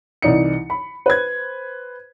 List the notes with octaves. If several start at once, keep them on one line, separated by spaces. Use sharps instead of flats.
C2 E3 D#4 D5 D#5 C#7
B5
B4 C5 G#6